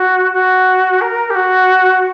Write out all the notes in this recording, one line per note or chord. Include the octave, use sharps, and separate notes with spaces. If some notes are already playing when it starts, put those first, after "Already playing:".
Already playing: F#4
F#4
A#4
G4
F#4